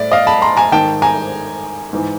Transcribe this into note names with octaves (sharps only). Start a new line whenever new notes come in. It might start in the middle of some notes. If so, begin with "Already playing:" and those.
Already playing: A2 D5 E5
D#5 F5
A5 B5
A#5 C6
G#5 A#5
G#2 D#3 G5 A5
G#5 A#5
G#2 E3